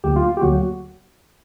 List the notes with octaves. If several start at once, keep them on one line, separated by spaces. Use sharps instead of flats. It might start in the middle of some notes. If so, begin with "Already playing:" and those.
D2 D3 F#3 A#3 G4
F4
G4
D2 D3 F#3 A#3 F#4